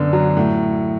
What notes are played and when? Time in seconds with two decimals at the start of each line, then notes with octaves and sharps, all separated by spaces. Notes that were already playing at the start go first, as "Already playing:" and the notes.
Already playing: F#2 D3 B3
0.13 F#3
0.37 A2